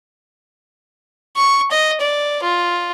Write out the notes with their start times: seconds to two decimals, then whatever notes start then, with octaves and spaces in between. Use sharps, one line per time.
1.37 C#6
1.71 D#5
2.00 D5
2.43 F4